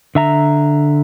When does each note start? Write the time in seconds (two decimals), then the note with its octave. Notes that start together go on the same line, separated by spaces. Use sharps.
0.15 D3 E5 A#5